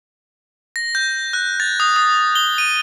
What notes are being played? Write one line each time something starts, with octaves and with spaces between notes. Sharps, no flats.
A#6
G6
F#6
A6
D#6
D#6
G7
D#7